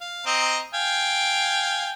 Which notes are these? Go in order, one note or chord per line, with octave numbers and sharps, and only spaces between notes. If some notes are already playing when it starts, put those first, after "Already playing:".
F5
C4 D#5 A#5
F5 G5 G#5